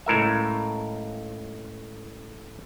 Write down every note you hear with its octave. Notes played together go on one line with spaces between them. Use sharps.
C#2 A2 A#4 E5